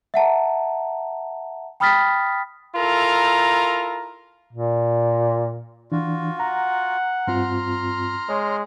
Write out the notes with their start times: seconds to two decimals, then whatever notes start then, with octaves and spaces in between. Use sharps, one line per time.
0.14 E5 F#5 A5 A#5
1.80 G5 B5 D#6 F6 A6 B6
2.76 E4 F4 A4 A#4 A#5
4.53 A#2
5.92 E3 D4 F4 F#4
6.40 F#5 A#5
7.27 G2 C4 F4 A#5 C6 F6
8.29 G#3 C#5